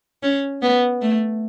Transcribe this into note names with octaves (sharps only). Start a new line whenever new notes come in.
C#4
B3
A3